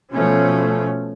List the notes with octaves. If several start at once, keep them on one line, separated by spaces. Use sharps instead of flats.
B2 F3 A3 C#4